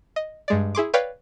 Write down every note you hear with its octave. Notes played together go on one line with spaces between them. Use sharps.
D#5
G2 G#3 D5
E4 G#4 C6 D6
B4 C#5 D5 F5 G5